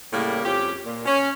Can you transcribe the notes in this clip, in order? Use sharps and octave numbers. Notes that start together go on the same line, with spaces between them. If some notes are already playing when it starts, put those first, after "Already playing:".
A2 C#3 G3 A#3
F2 C#4 G4
A#2
C#4